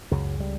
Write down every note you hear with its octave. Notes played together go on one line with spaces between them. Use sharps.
C#2 F#2 C#3 F#3
G3